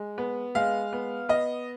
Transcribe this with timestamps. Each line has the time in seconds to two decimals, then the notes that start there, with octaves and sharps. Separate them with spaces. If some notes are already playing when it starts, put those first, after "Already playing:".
Already playing: G#3
0.18 B3
0.55 G#3 F5
0.93 B3
1.29 B3 D#5